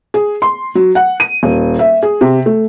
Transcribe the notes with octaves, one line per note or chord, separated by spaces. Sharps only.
G#4
C6
F#3
F#5
D#7
D#1
E5
G#4
C3
A3